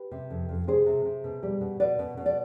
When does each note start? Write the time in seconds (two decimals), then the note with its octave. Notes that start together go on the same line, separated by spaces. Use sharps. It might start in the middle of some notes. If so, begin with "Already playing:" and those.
Already playing: G4 B4
0.11 C3
0.30 F2
0.49 F2
0.67 C3 G#4 C5
0.86 C3
1.05 C3
1.24 B2
1.43 G3
1.61 B2
1.80 B2 B4 D5
1.99 B2
2.17 B2
2.26 D5